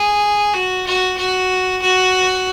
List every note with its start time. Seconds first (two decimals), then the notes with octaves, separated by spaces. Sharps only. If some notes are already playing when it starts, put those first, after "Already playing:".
Already playing: G#4
0.54 F#4
0.86 F#4
1.17 F#4
1.82 F#4